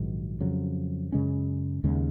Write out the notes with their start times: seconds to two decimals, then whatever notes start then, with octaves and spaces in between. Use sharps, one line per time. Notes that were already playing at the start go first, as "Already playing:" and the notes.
Already playing: A#1 G#2 D#3 F#3
0.40 F2 C#3 F#3
1.12 F#2 C#3 G#3 C#4
1.84 D#2 C#3 G#3 C#4